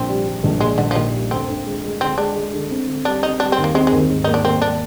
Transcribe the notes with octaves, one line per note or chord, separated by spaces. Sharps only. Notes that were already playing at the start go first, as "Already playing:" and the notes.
Already playing: A#1 C4
G3
G3
A#1
A#2 G#3
A#1 D3
F3
A#2 D#3
G3
D2 C4
D2
G#3
G#3
D3 C4
G#3 D4
G#3
D3
C4
D3
G3 D4
C4 D#4
G3 D4
C4
D#2
A#3
G#3 C4
D#2 G#3
G#2
A#3 D#4
D4
A#3 C4
A#3 D4